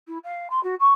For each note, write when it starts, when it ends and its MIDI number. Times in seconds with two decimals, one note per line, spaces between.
0.07 0.18 64
0.24 0.47 77
0.50 0.62 84
0.63 0.75 66
0.80 0.93 85